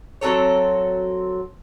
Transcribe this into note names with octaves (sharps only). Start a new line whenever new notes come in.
F#3 C4 A4 C#5